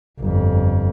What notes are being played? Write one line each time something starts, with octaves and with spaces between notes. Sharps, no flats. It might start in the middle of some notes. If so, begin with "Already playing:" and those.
G1 F2